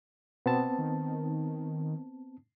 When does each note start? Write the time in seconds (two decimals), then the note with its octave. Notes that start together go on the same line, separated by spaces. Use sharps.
0.46 B2 B3 C4 A5
0.78 D#3